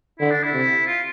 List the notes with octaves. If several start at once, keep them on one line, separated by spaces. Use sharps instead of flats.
D3 E4
D4
E4
C3
F4